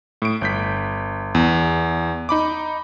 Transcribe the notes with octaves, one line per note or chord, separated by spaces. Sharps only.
A2 D7
G1 G6 B6
E2
D#4 B5 D6